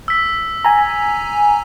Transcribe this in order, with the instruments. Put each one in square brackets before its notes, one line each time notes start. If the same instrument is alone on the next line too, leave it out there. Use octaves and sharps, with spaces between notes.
[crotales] E6 B6
[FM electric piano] G#5 A#5